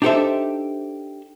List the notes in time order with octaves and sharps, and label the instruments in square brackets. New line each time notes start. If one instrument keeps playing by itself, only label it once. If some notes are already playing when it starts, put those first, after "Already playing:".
[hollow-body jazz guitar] D4 D#4 G4 A4 C5 E5